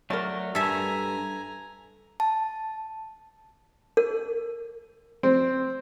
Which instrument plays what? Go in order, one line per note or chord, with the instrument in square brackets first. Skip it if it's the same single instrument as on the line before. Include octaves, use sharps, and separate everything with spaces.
[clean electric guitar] F#3 A3 [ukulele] A#4 D5
[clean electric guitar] G2 [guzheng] A4 E5 [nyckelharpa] G#5 A#5
[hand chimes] A5
[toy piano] A#4
[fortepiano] C4